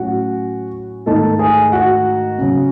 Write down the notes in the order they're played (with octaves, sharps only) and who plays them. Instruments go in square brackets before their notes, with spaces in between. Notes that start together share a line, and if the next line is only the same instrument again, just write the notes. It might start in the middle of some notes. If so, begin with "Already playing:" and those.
Already playing: [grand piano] A2 F#3 C#4 F#4 F#5
G#2 D#3 A3 D#4 A4 A5
G#4 G#5
F#4 F#5
C#3 F#3 C#4